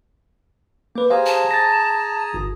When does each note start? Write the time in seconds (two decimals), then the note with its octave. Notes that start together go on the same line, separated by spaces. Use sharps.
0.96 A#3 B4 D6
1.10 G4 G#4 C5 F5 G#5 A#5
1.26 A5
1.51 A6 A#6
2.34 G1